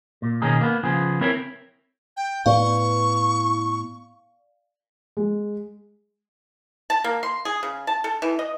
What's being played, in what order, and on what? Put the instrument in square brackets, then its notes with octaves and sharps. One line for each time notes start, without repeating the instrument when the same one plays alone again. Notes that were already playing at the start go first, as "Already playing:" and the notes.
[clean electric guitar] A#2
B2 D#3 C#4 D#4 G#4
A#3 B3
C#3 F3 B3 G#4
C4 E4 A#4 B4 C#5
[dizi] G5
[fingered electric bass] A2 B3 [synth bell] D5 F5 [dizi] C#6
[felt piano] G#3
[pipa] A5
A#3
C6
G#4
C#3
A5
A4
E3
D#5